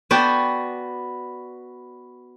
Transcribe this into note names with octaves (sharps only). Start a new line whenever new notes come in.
B3 F#4 D5 G5 A5